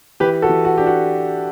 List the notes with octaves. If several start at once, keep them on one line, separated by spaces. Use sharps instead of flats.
E3 G4 B4
F#4 A4
E3
F#4
D4 G4
F#4